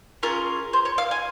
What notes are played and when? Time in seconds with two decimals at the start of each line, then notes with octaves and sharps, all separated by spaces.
0.23 C#4 F4 G#4 A#4
0.73 C5
0.85 C#5
0.98 F5
1.11 G#5